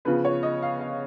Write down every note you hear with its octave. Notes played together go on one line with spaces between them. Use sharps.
C#3 F3 B3 B4
C#5
D#5
F5
F5